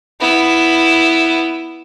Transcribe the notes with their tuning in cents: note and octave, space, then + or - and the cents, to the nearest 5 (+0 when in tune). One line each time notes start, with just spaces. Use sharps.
B3 +0 E4 +0